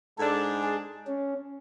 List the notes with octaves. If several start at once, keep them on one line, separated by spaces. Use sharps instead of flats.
G#2 G#3 D4 A4
G#4
C#4